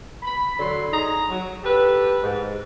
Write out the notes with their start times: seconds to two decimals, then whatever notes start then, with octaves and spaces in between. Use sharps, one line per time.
0.23 B5
0.59 D3 F#3 C6
0.92 D#4 G#4 A#5
1.30 F#3
1.63 G4 A4 B4
2.23 G#2